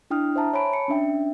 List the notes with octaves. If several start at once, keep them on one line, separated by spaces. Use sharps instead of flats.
D4 E4 G5 D#6 F6
C5 E5 A5 A#5
C#5 G#5 A5 B5 D7
C#7
C#4 D4 E5 G5